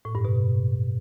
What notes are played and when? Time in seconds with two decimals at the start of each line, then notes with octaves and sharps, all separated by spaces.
0.05 A2
0.15 G2
0.25 B2